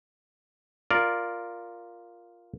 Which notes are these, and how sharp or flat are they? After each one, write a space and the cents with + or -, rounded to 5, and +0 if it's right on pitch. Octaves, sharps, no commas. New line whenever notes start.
F4 +0 A#4 +0 D5 +0